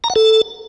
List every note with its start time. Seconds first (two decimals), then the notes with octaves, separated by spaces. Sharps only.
0.04 A#5
0.10 F#5
0.16 A4